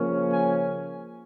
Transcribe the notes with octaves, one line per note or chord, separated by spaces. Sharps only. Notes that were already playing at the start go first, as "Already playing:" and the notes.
Already playing: C#3 F3 A#3 C#4
G#5